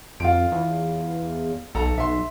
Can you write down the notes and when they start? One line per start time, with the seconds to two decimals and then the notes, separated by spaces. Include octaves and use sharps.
0.20 F2 F4 D7
0.52 E2
1.75 B1 A4 A#5
1.98 B1 E5 C6